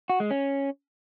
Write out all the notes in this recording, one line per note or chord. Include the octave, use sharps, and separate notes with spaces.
F#4
G#3
C#4